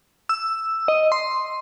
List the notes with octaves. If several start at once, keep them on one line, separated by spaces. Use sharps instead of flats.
E6
D#5
C6